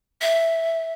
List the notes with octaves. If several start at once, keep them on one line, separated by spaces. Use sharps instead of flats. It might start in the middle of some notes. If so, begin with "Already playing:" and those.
E5